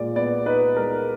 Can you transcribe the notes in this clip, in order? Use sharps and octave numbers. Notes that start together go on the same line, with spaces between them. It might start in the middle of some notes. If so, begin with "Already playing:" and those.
Already playing: A#2 G#3 D5
B3 D5
D#4 B4
G#3 A#4